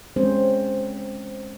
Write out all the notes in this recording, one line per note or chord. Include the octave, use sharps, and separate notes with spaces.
G#3 C4 C#4 C5